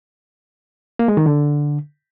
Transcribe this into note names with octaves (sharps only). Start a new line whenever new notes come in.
A#3
G#3
D#3
D3